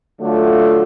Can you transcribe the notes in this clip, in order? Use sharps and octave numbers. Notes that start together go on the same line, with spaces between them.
D3 F#3 A3 F4